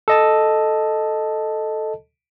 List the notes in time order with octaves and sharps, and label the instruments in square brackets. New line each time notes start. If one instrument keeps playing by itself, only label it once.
[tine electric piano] A4 D#5 A5